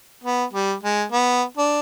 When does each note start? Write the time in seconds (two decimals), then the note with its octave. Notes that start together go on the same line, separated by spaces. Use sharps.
0.24 B3
0.53 G3
0.83 G#3
1.12 B3
1.57 D4